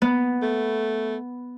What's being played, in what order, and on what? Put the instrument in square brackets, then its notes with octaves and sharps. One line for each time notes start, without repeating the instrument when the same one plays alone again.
[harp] B3
[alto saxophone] A3